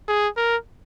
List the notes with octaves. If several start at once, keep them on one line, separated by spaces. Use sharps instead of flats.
G#4
A#4